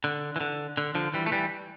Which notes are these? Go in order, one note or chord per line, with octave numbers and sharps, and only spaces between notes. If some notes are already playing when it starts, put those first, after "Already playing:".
D3
E3
D3
D3
D3 F3
E3 G3
A3
E3 G3